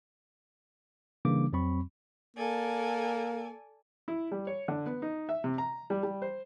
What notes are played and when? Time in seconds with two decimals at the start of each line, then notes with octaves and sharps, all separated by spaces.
1.25 C#3 E3 G3 A#3 D4 D6
1.53 F2 F#3 C4 B5 C#6
2.36 A#3 A4 D5 G#5
4.08 E4
4.32 G3
4.47 C#5
4.68 D3
4.86 B3
5.02 D#4
5.29 E5
5.44 C3
5.58 A#5
5.90 G3
6.03 G3
6.22 C5